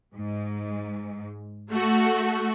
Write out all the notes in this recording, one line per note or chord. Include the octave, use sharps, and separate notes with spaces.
G#2
A3 F#4